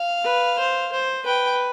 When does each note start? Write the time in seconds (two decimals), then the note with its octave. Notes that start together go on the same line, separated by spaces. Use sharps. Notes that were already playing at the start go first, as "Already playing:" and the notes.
Already playing: F5
0.24 B4
0.58 C5
0.92 C5
1.25 B4 G5